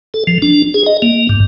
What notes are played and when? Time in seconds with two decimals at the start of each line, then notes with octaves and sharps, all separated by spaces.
0.14 A4
0.27 F3
0.42 D4
0.74 G#4
0.86 D#5
1.02 A#3
1.29 G2